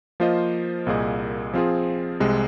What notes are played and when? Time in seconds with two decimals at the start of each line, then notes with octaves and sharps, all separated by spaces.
0.20 F3 A#3 F4 C5 D#5
0.86 C2 A#2 A#3 G#4 D#5
1.54 F3 C4 F4 G#4
2.20 C2 C3 G#3